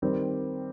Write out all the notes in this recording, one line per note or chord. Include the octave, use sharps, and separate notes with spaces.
D#3 G3 C4